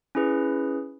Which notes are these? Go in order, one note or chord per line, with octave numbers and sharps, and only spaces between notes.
C#4 E4 G#4 B4